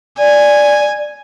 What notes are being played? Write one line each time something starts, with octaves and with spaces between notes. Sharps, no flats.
D5 G#5